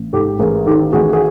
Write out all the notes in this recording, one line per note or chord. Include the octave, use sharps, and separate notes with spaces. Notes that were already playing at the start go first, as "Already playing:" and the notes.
Already playing: A1
G#2 G4 A4
A1 G#4 A#4
D#3 G4 A4
A1 F#4 G#4
F#4 G#4